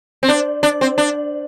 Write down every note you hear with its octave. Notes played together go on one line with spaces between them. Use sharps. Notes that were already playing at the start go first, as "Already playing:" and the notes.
C4
D4
D4
C4
D4